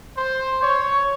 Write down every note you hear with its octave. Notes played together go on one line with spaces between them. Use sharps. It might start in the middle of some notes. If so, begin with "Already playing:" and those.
C5
C#5